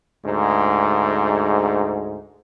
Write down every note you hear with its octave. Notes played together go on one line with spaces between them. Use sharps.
D2 G#2